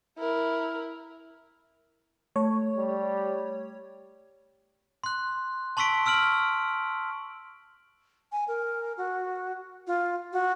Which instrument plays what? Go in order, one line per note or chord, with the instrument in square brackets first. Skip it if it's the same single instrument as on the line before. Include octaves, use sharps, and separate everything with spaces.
[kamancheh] E4 A#4
[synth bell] A3 [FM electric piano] C#5
[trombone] G3
[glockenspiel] C6 F#6
A5 C6 C#6 E6 B6 D7
C#6 E6 F6 D7 F#7
[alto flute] G#5
A#4
F#4
F4
F#4